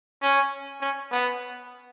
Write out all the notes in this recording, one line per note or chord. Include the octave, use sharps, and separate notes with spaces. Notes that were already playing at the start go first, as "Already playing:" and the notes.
C#4
C#4
B3